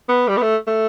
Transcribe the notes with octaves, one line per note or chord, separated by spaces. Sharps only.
B3
G3
B3
A3
A3